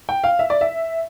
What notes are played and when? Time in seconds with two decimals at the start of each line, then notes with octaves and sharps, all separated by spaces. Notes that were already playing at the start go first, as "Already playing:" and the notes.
0.09 G5
0.24 F5
0.39 E5
0.50 D5
0.61 E5